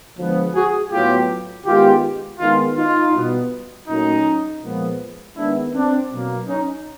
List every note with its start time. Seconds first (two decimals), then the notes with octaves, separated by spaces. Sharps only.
0.18 D3 F3 G#3 B3
0.55 F#4 G#4
0.92 A2 F#3 B3 F4 G4
1.65 D#3 G#3 B3 F4 G4
2.39 D#3 G#3 B3 D#4 F4
2.76 D#4 F4
3.13 B2 G3 B3
3.88 A#2 F#3 A3 C#4 D#4
4.62 A#2 F3 G#3 B3
5.36 D#3 G#3 B3 D4 E4
5.74 C4 D4
6.11 B2 F#3 A#3
6.47 C#4 D#4